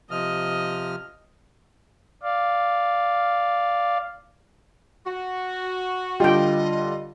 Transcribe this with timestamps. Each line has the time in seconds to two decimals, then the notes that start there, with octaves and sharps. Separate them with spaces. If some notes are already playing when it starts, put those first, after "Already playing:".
0.11 C3 F3 D#5 F6
2.23 D5 F5
5.06 F#4
6.20 D3 G3 F4 G4 D#5 G5